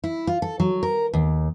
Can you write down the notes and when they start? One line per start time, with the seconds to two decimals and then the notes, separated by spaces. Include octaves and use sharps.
0.04 E4
0.27 F4
0.42 A4
0.60 F#3
0.83 A#4
1.14 D#2